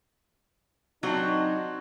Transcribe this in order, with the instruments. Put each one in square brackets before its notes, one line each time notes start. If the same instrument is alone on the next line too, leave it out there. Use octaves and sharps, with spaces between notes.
[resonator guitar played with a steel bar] F#3 [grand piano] C4 D4 [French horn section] D#4